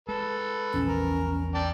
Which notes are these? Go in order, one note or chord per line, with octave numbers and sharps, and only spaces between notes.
G#3 A4 B4
A#1 E2 C#4
A#4
D5 G5 A5